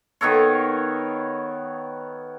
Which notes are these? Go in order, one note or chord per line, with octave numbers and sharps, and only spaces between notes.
D#3 B3 A4 C#5